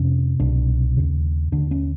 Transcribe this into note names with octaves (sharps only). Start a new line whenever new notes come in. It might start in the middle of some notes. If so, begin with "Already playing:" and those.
Already playing: F2 C3 C#4
C2 B2 D4
D#2 C#3
D#2 D3 D4
C#4